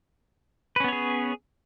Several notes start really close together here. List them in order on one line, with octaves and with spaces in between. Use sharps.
B4 C#4 B3 C#5 G#4